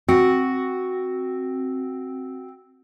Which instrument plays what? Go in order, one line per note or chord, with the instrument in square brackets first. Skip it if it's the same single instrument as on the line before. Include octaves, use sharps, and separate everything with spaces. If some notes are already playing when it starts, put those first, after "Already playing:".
[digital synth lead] C4 [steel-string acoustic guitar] F#4